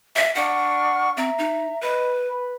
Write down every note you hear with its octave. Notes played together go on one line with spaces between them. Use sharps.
E5
D4 F#5 C#6 F6
C4 E5 A#5
D#4
B4 D#5 B5
B4 B5